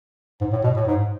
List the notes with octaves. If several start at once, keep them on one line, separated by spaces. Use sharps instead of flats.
G#2
A2
B2
A2
G#2